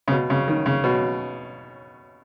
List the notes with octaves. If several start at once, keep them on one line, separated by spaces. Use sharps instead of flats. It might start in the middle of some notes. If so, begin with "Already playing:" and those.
C#3
B2
C#3
D#3
C#3
B2